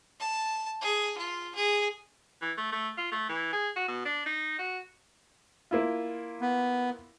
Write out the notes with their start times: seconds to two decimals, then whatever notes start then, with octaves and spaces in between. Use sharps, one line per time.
0.20 A5
0.81 G#4
1.17 F4
1.55 G#4
2.42 E3
2.58 A3
2.72 A3
2.97 F4
3.12 A3
3.29 E3
3.53 G#4
3.76 F#4
3.88 B2
4.05 D4
4.26 D#4
4.59 F#4
5.71 A#3 E4 F4
6.41 B3